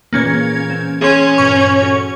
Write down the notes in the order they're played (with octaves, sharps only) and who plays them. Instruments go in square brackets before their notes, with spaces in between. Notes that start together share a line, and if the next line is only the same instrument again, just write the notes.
[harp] A#2 E3 G#4 [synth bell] A#3 C#4 G#6
[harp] C4 C5
[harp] C4 [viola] C#4 [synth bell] G#4 C6
[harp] G2 A#2 [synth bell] C#6
[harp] F#4 A4 C#5